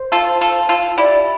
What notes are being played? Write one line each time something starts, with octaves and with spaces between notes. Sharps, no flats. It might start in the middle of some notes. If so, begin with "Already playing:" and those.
Already playing: C5
F4 A4
F4 A4
F4 A4
E4 G4 D5